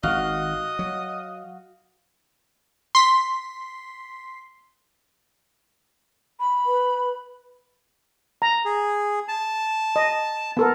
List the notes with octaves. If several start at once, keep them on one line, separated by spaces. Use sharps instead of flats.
G#1 D#3 F#4 D#5 F5
F#3
C6 B6
B5
B4
A#5
G#4
A5
D#5
B3 A4 A#4